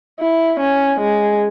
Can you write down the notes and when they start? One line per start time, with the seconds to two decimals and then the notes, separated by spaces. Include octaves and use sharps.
0.20 E4
0.60 C#4
1.00 G#3